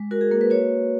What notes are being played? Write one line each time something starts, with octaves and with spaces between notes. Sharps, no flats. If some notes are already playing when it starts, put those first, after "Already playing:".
Already playing: G#3
F#4 A#4
G#4
A#3 A#4
B4
F#4 C#5